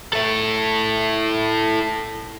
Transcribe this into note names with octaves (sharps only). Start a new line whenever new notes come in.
E4 A4